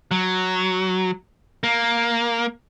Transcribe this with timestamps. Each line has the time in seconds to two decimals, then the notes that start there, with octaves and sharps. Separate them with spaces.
0.11 F#3
1.63 A#3